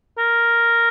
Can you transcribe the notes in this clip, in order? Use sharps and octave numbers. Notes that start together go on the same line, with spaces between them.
A#4